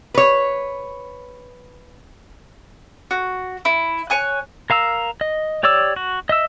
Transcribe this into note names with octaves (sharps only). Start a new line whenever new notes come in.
B4 C#5
F#4
E4
C#5 G#5 F#6
A#4 F5 A#5 E6
D#5
G4 C#5 D5 D6 E6
F#4
D#5 E5 E6